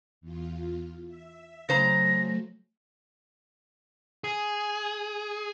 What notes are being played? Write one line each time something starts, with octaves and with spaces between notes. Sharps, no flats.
E2 F4
E5
C#3 F#3 A3 C5 A#5 A#6
G#4